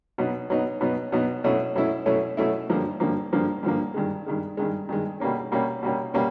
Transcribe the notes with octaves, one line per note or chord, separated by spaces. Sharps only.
B2 F#3 B3 D#4
B2 F#3 B3 D#4
B2 F#3 B3 D#4
B2 F#3 B3 D#4
B2 F#3 A3 C#4 E4
B2 F#3 A3 C#4 E4
B2 F#3 A3 C#4 E4
B2 F#3 A3 C#4 E4
G2 D3 F3 A#3
G2 D3 F3 A#3
G2 D3 F3 A#3
G2 D3 F3 A#3
G2 D#3 G#3
G2 D#3 G#3
G2 D#3 G#3
G2 D#3 G#3
B2 G3 A#3 C#4
B2 G3 A#3 C#4
B2 G3 A#3 C#4
B2 G3 A#3 C#4